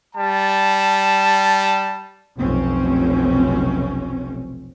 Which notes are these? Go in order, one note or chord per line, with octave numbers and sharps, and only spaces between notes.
G3 A5
F1 B1 C4 C#4